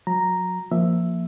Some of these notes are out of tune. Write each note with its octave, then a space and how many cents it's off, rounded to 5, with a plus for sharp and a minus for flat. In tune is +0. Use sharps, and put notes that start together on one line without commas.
F#3 -30 A#5 +0
F3 +0 A#3 +0 E5 +0